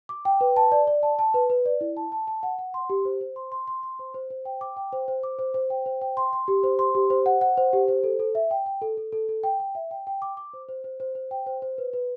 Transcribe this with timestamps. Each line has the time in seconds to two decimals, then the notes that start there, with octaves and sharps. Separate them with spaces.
0.09 D6
0.25 G5
0.41 B4
0.56 A5
0.72 D5
0.87 D5
1.03 A5
1.19 A5
1.34 B4
1.50 B4
1.66 D5
1.81 E4
1.97 A5
2.12 A5
2.28 A5
2.43 F#5
2.59 F#5
2.74 C6
2.90 G4
3.05 C5
3.21 C5
3.36 C6
3.52 C6
3.68 C6
3.83 C6
3.99 C5
4.14 C5
4.30 C5
4.45 G5
4.61 D6
4.77 G5
4.92 C5
5.08 C5
5.23 D6
5.39 C5
5.54 C5
5.70 G5
5.86 C5
6.01 G5
6.17 C6
6.33 C6
6.48 G4
6.63 C5
6.79 C6
6.95 G4
7.10 C5
7.26 F#5
7.41 F#5
7.57 C5
7.73 G4
7.88 C5
8.04 A4
8.19 A4
8.35 E5
8.51 G5
8.66 G5
8.82 A4
8.97 A4
9.12 A4
9.29 A4
9.43 G5
9.60 G5
9.75 E5
9.91 G5
10.07 G5
10.22 D6
10.37 D6
10.53 C5
10.69 C5
10.84 C5
11.00 C5
11.15 C5
11.31 G5
11.47 C5
11.62 C5
11.78 B4
11.93 B4